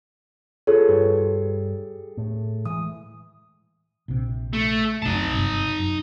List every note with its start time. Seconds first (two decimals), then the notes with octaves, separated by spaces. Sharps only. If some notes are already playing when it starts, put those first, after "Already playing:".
0.67 F4 G#4 A4 B4 C#5
0.89 G2 G4
2.17 A2
2.66 E3 G#3 D#6
4.08 A#1 C3
4.53 A3
5.02 F#1 C2 F#2 D#4 A5
5.34 G1 F#2 C3
5.79 F#2